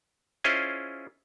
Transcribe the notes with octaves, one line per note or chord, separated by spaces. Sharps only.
C#4 E4 F4 G#4 C5 D#5